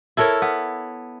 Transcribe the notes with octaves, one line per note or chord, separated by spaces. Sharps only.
E4 A4 A#4 C#5
B3